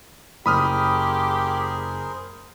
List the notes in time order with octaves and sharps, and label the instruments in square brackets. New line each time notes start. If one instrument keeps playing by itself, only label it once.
[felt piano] F#1 [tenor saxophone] G4 [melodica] G#4 A#4 C5 [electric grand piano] B5 D#6 F6